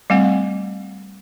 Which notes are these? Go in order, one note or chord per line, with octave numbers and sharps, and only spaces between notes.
G3 A3 C4 F#5